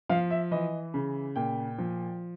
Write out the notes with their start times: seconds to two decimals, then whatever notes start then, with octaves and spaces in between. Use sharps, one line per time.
0.09 F3 F5
0.30 E5
0.51 E3 D#5
0.94 C#3
1.36 A#2 G5
1.78 F3